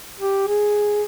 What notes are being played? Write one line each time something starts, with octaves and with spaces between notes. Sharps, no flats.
G4
G#4